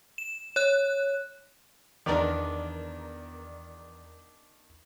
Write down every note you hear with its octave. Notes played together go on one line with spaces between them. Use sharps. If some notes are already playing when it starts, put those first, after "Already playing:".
E7
C#5 F#6
E2 D#3 B3 D4 A#4 D5